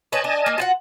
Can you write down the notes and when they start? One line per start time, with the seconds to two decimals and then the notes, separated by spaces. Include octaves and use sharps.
0.12 B4 C#5 D#5 G#5 A5
0.24 D4
0.46 A#3 D#4
0.58 F4 F#4 F#5